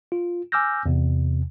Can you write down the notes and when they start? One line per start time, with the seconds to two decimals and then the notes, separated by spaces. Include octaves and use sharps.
0.12 F4
0.52 G#5 D6 E6 F6 G6 A#6
0.86 E2 C3